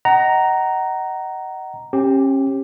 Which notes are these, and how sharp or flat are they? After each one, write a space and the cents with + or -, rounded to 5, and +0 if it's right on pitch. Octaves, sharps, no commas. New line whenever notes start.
D#5 +0 F#5 +30 A#5 +0
C#4 -35 G4 +0